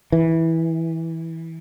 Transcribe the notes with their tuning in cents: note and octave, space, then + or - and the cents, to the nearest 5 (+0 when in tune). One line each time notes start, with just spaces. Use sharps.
E3 -15